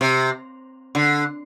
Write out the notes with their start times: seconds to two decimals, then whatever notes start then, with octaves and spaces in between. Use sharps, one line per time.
0.01 C3
0.95 D3